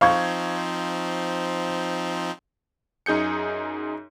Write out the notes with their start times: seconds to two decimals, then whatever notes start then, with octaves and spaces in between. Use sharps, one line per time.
0.01 F3 C4 D#4 F5 C#6 G#6
3.06 F#2 D#4 G#4 G6 C#7